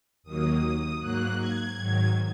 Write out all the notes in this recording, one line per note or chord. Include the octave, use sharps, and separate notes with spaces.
D#2 D#3 F#3 A#3 D#6
G#2 F#3 A#3 F#6
G#6
G#2 D#3 F#3